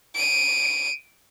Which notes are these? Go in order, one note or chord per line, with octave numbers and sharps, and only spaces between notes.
D7 D#7